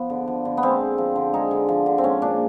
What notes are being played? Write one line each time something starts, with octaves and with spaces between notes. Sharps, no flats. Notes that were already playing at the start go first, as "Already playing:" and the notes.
Already playing: F3 B3
D3
F3
D3
B3
G#3 C4
D3
F3
D3
G#3 D#4
D3
F3
D3
C4
G#3 C#4
A#2 D4